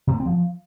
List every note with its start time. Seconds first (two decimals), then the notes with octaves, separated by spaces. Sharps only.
0.07 C3
0.14 A#3
0.20 C4
0.26 F3